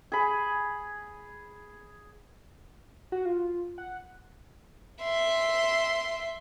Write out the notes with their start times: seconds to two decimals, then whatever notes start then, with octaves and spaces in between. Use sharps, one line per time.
0.12 G#4 B5
3.12 F#4
3.25 F4
3.78 F#5
5.03 E5 C6